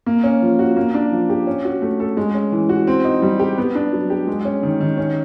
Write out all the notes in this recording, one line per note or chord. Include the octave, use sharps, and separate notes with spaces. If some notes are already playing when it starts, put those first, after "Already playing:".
A#3
C#4
F3
F#4
A#3
D4
F3
G4
C#4
F#4
A3
A4
G#3
C#4
E3
F#4
C4
D#4
G3
G4
B3
D4
F#3
G4
G#3
C#4
D#3
D#3
C#4